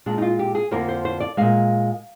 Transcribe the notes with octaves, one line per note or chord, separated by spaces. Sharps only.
A#2 G#3 D4
D#4
F4
G4
G#4
F2 D3 F3 A#3 A#4
C5
C5
D5
A#2 G#3 F5